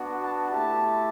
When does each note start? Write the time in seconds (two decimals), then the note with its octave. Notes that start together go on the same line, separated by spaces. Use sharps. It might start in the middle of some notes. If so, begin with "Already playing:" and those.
Already playing: B3 D4 F#4
0.23 A5
0.51 A3 E4 G4 A5